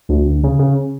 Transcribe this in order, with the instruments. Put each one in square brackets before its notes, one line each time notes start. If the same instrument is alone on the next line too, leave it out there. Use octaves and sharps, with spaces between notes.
[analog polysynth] D2
D2
C#3
C#3